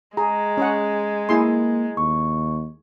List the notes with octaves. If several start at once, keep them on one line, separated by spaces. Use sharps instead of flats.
G#3 G#4 A#5
C#4 G#4 F#5
A#3 E4 G#4 C6
D#2 C#6